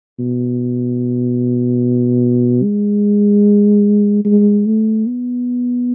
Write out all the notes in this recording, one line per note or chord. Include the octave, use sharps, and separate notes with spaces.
B2
G#3
G#3
A3
B3